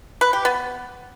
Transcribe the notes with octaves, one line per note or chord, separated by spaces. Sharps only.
B4
G4
B3